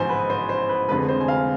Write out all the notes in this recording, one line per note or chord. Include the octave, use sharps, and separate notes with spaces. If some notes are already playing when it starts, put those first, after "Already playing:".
Already playing: A1 G#2 F3 B3 C5 G#5
B4
C5
C5
B4
F1 F2 D3 G#3 B4
C5
G#5
F5